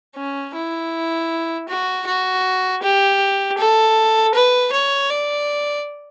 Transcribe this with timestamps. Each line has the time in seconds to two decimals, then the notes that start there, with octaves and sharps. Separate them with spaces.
0.16 C#4
0.55 E4
1.69 F#4
2.07 F#4
2.83 G4
3.58 A4
4.35 B4
4.73 C#5
5.10 D5